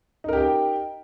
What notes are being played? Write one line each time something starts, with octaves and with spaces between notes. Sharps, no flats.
D#4 G4 A#4 G5